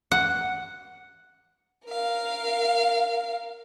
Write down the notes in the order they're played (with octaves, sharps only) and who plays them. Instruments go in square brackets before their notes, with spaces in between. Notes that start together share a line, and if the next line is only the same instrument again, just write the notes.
[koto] F#5
[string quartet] A#4 F5